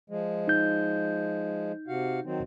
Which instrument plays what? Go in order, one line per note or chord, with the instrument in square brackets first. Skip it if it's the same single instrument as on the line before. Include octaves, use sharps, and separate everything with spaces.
[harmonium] F3 G#3
[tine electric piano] D#4 G6
[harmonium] C3 F#4 F5
D#3 F#3 C4